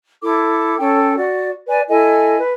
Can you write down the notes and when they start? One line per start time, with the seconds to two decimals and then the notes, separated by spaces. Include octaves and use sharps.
0.22 E4 A4 D6
0.79 C#4 A4 G5
1.17 F#4 D5
1.67 B4 D5 G#5
1.89 E4 A4 D#5 G#5
2.39 B4